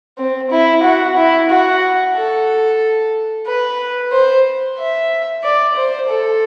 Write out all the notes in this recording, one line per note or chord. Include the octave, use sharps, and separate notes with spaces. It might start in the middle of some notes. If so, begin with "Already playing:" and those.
C4
E4
F#4
E4
F#4
A4
B4
C5
E5
D5
C5
A4